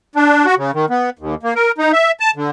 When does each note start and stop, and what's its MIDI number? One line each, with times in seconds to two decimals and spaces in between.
0.16 0.46 62
0.46 0.55 66
0.58 0.71 49
0.74 0.86 51
0.90 1.10 59
1.19 1.35 39
1.43 1.54 58
1.56 1.72 70
1.78 1.92 63
1.93 2.12 76
2.20 2.31 81
2.36 2.51 50